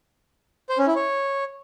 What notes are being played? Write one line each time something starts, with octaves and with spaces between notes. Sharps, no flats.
C5
C#4
E4
C#5